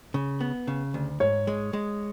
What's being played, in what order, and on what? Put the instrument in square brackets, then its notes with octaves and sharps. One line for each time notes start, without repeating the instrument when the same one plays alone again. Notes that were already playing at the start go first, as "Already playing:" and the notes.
[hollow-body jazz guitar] C#3
B3
C#3
D2
[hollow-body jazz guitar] G#2 [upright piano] C#5
[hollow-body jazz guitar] G#3
G#3